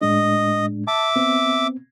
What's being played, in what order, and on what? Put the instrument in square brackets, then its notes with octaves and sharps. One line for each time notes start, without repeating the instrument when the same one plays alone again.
[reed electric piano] A2 G#3 D4 [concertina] D#5
[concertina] E5 D6 [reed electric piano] A5
[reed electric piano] B3 C4